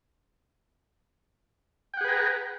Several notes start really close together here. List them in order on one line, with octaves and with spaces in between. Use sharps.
G5 F#5 G#4 B4 A#5